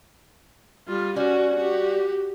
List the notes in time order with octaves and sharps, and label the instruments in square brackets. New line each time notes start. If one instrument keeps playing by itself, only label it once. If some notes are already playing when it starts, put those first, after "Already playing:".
[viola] G3 F4
[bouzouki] G3 [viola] C#4 F#4
[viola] F#4 G4